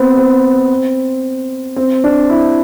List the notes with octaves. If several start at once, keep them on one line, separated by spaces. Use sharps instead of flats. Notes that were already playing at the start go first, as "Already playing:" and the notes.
Already playing: B3 C4
C4
C4
D4
E4